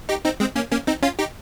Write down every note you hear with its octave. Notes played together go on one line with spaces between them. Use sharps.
D#4 G4
C4 D#4
G#3 C4
A#3 C#4
A#3 C#4
C4 D#4
C#4 F4
D#4 G4